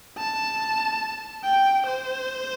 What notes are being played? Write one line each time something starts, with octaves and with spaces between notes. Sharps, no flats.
A5
G5
C5